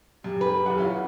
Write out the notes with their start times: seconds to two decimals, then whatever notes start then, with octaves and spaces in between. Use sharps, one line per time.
0.24 F#2 G4
0.41 B4
0.66 E2 F#5
0.78 C#4 E4 F4